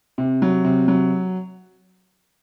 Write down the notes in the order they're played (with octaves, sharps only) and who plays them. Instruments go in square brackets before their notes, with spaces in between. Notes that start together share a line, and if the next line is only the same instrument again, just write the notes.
[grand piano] C3
F#3
C3
F#3